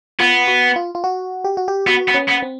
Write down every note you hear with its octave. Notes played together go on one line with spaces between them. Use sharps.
B3 F4
F#4
F4
F4
F#4
G4
F#4
G4
B3 F#4
B3
C#4
B3
C4